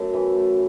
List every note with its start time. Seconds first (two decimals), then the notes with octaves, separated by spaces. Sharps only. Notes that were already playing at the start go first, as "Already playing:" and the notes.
Already playing: F#2 A3 A4
0.14 E3
0.35 A3